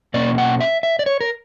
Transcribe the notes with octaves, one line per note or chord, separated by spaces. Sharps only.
B2 A#3 C#4 D5
F#5
E5
E5
D5
C#5
A#4